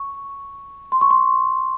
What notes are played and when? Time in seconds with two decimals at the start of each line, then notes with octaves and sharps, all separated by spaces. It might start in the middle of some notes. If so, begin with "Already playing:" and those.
Already playing: C#6
0.92 C6
1.01 C#6
1.11 C6